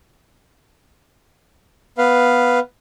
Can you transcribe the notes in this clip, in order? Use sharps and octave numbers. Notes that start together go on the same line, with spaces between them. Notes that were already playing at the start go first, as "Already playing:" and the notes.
B3 B4 F5